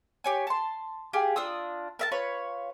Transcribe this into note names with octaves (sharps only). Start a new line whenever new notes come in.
G4 C#5 G#5
A5 C6
G4 G#4 F5
D4 F4 D#6 E6
A#4 E5 A5
F4 B4 C#5